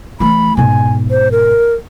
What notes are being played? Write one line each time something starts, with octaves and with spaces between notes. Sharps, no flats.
E3 A3 B5
G#2 B2 G#5
C5
A#4